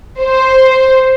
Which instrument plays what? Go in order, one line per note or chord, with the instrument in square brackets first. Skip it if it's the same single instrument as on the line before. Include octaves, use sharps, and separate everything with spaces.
[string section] C5